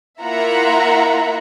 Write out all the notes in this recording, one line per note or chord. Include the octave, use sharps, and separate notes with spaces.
A#3 E4 F4 E5 F#5 A#5